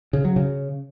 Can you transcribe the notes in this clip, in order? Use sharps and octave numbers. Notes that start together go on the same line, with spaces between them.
C#3
F#3
C#3